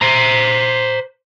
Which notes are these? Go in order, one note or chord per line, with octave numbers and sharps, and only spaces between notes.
C5 A#5